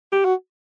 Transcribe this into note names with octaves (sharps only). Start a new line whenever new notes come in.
G4
F#4